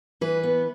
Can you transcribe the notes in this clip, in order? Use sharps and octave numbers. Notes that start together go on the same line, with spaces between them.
E3 B4
B3